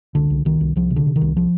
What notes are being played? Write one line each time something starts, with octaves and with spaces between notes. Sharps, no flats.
C2 D3
C2
C2 D#3
C2
C2 F3
C3
D3
C3
D#3
C2
F3